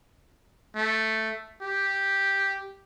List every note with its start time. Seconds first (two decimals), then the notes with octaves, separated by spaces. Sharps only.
0.76 A3
1.62 G4